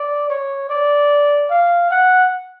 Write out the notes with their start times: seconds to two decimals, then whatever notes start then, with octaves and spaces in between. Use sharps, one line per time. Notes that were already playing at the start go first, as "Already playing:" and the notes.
Already playing: D5
0.30 C#5
0.70 D5
1.50 F5
1.91 F#5